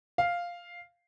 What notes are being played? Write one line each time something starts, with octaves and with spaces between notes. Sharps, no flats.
F5